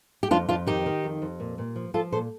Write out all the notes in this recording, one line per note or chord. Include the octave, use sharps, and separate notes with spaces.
G4
F2 D4 F4
F2 D4 F4
D#3 D#4 G4
D#3
F2
F2
A#2
A#2
F3
F3 F4 A4
A#2 A4 C5